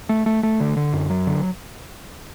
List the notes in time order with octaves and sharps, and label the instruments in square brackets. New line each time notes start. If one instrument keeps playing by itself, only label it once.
[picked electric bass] A3
A3
A3
D3
D3
F#2
F#3
D3